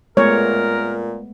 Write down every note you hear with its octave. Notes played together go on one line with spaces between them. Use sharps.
A#2 G#3 A3 B3 A#4 C#5